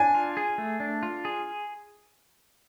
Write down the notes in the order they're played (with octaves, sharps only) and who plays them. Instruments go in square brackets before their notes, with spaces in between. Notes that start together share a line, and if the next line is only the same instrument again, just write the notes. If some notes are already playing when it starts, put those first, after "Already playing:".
Already playing: [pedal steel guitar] D4 [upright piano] G#5
[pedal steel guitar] F4
G#4
A3
D4
F4
G#4